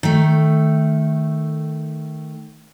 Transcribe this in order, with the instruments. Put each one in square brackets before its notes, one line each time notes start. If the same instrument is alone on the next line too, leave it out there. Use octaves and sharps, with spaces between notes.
[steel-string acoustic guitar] D#3 A3